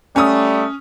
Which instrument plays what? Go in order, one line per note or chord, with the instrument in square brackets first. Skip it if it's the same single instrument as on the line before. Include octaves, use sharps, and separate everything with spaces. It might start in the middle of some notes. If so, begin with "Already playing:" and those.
[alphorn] G3 [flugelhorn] A3 [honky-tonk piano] C#4 D#6